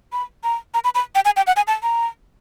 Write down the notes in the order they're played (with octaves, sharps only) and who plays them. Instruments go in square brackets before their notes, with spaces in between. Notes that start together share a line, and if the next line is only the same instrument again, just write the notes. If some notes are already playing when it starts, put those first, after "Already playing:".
[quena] B5
A#5
A#5
B5
B5
G5
G#5
G5
F#5
G#5
A5
A#5